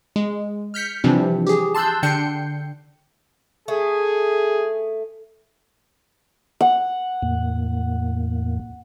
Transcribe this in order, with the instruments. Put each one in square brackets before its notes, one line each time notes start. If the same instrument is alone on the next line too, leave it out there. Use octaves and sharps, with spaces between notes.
[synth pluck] G#3
F6 G6 B6 C#7
C3 E3 F3 G3 C4 D4
G4 G#4
A5 C6 E6 F#6 G6
D3 D4 G5 G6 C7 C#7
[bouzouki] A3 [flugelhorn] G#4
[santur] F#5
[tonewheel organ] E2 A2 A#3